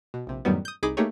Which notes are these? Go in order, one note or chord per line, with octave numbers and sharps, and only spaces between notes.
B2
A#1 C3
F#2 A2 D#3 F#3 G3 B3
D#6 G6
C2 D#4 G#4 B5 D6
A3 A#3 D#4 G4 G#4 C#5